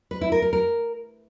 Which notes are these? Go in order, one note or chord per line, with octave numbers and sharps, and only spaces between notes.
B4
E4
A#4
A#4
A#4